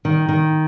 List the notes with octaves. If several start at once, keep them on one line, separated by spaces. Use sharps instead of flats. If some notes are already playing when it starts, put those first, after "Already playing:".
D#3
D#3